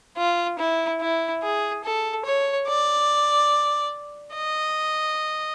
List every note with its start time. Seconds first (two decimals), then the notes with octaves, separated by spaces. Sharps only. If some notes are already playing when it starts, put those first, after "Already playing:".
0.18 F4
0.59 E4
1.01 E4
1.43 G#4
1.84 A4
2.25 C#5
2.68 D5
4.35 D#5